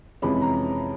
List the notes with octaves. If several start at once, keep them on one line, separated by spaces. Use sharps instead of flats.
F2 C3 E3 G#3 C#4 B5
A#5